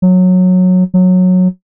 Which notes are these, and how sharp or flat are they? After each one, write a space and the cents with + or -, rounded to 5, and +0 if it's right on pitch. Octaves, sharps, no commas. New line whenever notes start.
F#3 -15
F#3 -15